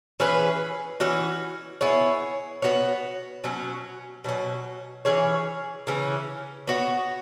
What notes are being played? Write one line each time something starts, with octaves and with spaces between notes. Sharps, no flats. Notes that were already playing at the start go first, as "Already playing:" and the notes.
E3 C#4 G#4 B4
E3 C#4 F#4
B3 E4 G#4 C#5
B3 F#4 C#5
B2 F#3 C#4
B2 F#3 C#4
E3 C#4 G#4 C#5
C#3 E3 C#4
B3 F#4 C#5